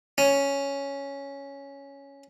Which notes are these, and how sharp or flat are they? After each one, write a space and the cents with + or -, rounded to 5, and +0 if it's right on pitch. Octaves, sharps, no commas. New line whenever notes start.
C#4 +5